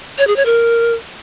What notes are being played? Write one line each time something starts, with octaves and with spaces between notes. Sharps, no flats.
C#5
G#4
C#5
A#4